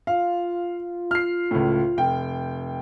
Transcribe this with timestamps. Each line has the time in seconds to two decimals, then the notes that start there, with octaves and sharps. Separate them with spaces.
0.07 F4 F5
1.11 F6 C7
1.51 C#2 A2
1.97 F1 G5